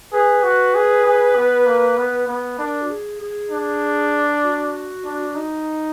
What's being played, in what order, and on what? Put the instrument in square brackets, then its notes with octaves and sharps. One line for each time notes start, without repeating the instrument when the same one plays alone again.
[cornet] G#4 [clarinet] B4
[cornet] F#4
G#4
G#4
B3
A#3
B3
B3
[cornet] D4 [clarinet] A#4
[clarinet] F#4
G#4
G#4
[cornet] D4
[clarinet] F#4
[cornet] D4
D#4